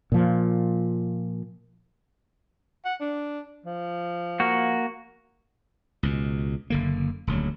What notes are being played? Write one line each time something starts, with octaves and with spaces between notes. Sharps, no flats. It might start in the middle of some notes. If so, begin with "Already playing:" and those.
A#2 F3
F#5
D4
F3
A#3 F#4
C#2 B2
F#1 D3 A#3
D#1 D2 F#3